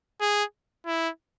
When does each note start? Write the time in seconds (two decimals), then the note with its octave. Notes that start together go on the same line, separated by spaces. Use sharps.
0.21 G#4
0.86 E4